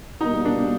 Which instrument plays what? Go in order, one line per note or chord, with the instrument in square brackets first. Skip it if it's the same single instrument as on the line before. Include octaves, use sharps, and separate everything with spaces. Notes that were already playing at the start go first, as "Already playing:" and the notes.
[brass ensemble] B2 G3 A#3 [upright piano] D#4
[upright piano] D4